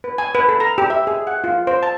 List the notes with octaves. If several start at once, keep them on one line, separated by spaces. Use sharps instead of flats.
B4
G#5
B4
A4
A#5
G4
E5
G#4
F#5
F4
C5
A5